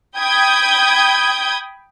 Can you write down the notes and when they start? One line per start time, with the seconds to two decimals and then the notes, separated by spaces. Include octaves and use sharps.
0.18 G5 B5 D#6 G6 G#6